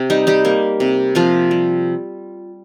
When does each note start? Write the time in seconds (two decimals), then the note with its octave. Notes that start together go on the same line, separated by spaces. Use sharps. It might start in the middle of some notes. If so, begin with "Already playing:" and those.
Already playing: C3 G4
0.10 G3 D#4
0.27 G3 G4
0.45 A#3
0.80 C3
1.15 C3 F3 F4
1.51 G3